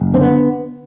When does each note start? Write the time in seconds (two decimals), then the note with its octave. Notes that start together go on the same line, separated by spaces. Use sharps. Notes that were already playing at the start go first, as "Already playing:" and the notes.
Already playing: F#1
0.14 D3 C4
0.21 B3